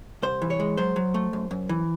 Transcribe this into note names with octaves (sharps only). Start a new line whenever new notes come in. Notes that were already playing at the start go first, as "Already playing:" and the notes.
C2 C5
E3
C#5
G#3
F#3 C5
F#3
A3
F#2
F#2
E3